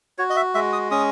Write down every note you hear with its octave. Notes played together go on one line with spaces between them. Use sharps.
F#4 C#5
D#5
E5
G#3 E5
D#6
C#4 D#6